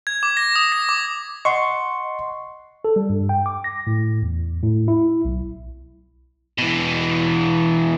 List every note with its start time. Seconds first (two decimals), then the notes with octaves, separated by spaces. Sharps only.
0.07 G#6
0.23 D6
0.37 A#6
0.56 D#6
0.72 A#6
0.89 D6
1.45 D#5 F#5 C6 C#6
2.85 A4
2.96 G3
3.10 G2
3.29 G5
3.46 D6
3.64 A#6
3.87 A2
4.22 E2
4.63 A2
4.88 E4
5.25 B1
6.58 B2 E3